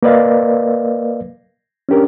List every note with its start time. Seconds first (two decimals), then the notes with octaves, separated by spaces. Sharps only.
0.03 A#3 A#4 B4 D5 D#5 F5
1.89 C#4 D4 G4 A#4